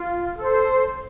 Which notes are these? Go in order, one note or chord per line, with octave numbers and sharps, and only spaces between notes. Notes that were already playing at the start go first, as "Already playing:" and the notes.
Already playing: F4
A4 C5